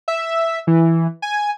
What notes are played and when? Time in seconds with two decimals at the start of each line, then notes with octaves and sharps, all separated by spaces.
0.08 E5
0.67 E3
1.22 G#5